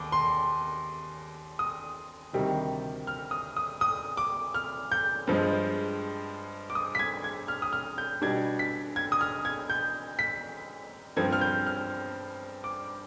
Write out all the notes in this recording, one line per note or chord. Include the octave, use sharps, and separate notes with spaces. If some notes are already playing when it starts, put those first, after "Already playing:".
Already playing: D#2 B3 D6
C6
D#6
D2 C3 D#3 G3
F6
D#6
D#6
D#6
D6
F6
G6
G2 F3 G#3
D6
D#6
B6
G#6
G#6
F6
D#6
F6
G6
B2 G3 D4 G#6
B6
G#6
D#6
F6
G#6
G6
B6
G2 F3 C4 G#6
F6
G6
F6
D6